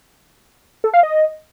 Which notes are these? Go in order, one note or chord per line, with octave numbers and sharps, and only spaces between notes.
A4
F5
D#5